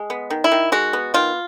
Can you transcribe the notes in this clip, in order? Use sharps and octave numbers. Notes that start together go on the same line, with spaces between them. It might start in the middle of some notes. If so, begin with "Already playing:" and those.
Already playing: G#3
B3
D#3
E4
D#3
G#3 F#4
B3
D#3 F4